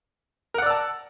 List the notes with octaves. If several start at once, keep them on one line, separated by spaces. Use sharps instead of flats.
A#4 D5 F#5 A5 E6